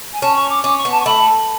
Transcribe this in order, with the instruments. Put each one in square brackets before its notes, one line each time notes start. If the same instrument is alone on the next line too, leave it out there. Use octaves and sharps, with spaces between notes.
[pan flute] G#5
[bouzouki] C#4 [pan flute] A5
[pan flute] C#6
D6
[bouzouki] C#4 [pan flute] D6
[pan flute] C#6
[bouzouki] B3
[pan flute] A5
C#6
[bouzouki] A3 [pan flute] B5